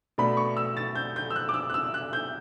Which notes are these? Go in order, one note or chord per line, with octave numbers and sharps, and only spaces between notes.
B2 A3 D4 B5
C#6
E6
A6
G6
G6
E6
F#6
D6
E6
F#6
E6
F#6
G6